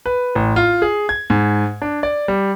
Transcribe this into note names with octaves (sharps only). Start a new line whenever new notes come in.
B4
A1
F4
G#4
G#6
G#2
D4
D5
G3